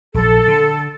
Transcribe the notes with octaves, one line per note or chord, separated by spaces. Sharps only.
A#1 F#3 A4
D3